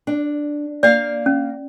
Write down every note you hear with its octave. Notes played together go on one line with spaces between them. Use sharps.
D4
A#3 D5 F5
C#4